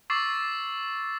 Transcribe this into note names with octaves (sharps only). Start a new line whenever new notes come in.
C#6 D6 E6 A6 C7